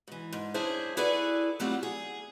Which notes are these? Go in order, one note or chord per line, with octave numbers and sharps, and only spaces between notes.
G#2 E3
G#2
F#2 C#4 D4 E4 G#4 C5
E4 F#4 G#4 A4 B4 D5
F#3 G3 A3 C4 F4 F#4
G#4